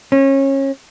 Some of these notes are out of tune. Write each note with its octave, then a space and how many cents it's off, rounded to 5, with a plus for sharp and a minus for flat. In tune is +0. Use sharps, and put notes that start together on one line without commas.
C#4 -25